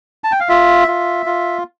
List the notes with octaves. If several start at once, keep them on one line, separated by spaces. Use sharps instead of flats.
A5
G5
F5
F4 E5
F4
F4